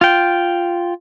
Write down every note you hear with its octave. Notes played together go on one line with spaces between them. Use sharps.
F4 G5